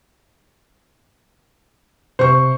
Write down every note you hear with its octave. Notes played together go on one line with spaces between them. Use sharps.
C3 C5 C#6